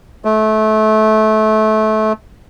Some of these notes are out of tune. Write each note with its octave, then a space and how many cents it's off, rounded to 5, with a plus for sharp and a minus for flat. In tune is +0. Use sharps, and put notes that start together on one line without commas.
A3 -25